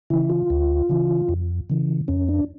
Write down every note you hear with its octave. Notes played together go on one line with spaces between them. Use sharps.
C#3 E3 E4
F4
D2
C#3 E3
F2
C#3 E3
F2 C#4
D4